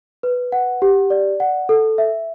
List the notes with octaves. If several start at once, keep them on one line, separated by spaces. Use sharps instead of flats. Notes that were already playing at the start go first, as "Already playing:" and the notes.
B4
F#5
G4
D5
F#5
A4
E5